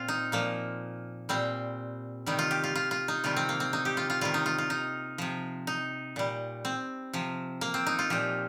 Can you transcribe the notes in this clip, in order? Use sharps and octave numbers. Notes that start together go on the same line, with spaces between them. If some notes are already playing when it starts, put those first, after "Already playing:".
Already playing: A#2 C4 F4
D#4
A#2 F3 A#3
A#2 G3 C4
C3 D#3 G3 D#4
F4
G4
F4
F4
F4
D#4
C3 D#3 G3 F4
C4
A#3
C4
D#4
G4
F4
F4
C3 D#3 G3 F4
D#4
F4
F4
D#4
C3 F3
D#4
A#2 G3
C4
C3 F3
A#3
C4
D#4
F4
A#2 F3 G4